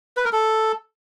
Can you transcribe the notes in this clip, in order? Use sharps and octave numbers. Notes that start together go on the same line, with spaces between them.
B4
A#4
A4